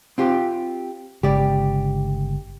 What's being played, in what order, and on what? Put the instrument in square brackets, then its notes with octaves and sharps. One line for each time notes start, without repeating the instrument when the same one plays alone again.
[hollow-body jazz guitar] C4 F4 G4
[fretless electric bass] G1 C#3 G#3 [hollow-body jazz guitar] G4 D5